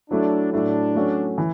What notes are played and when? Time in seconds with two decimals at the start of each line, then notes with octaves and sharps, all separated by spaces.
0.10 F#3 A3 D4 E4
0.52 A2 F#3 A3 D4 E4
0.95 F#3 A3 C#4 F#4
1.38 E3